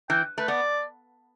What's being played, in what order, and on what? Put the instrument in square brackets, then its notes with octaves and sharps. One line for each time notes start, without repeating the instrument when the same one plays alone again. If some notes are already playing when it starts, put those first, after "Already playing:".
[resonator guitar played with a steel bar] E3 [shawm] G5
[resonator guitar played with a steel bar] A3 [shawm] B4
[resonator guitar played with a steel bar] B3 [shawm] D5